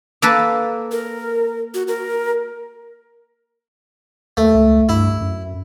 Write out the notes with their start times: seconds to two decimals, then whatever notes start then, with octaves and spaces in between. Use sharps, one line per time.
0.22 A#3 A4 B4
0.92 A#4
1.74 F#4
1.88 A#4
4.37 D#2 A3
4.55 C#2
4.89 G2 E4
5.21 F#2